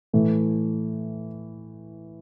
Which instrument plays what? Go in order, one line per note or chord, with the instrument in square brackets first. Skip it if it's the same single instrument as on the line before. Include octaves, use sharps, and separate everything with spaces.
[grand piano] A2 E3 A3